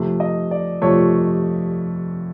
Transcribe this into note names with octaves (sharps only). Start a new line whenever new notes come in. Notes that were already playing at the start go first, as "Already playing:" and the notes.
Already playing: F2 C3 F3 A3
D#5
D5
F2 C3 F3 A3 C#5